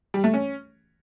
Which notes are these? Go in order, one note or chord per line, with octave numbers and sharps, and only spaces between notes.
G3
A3
C#4